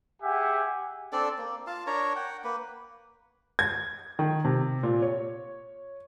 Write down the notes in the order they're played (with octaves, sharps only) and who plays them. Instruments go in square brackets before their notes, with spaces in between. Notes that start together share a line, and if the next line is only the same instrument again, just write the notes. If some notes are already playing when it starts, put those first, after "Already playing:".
[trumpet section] G4 G#4 E5 F#5 G#5
[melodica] C4 D4 A4 D5
A#3
F4 F5 A5
D4 A#4 C#5 A#5
F#5 G5
A#3 B4
[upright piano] G#6
D#3
C3
A#2
C#5